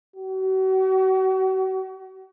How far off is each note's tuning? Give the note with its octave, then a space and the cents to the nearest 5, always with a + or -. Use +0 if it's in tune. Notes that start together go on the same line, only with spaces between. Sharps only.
F#4 +40